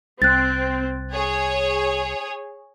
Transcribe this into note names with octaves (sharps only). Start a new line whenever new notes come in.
C2 C4 F#6 A6
G#4 C#5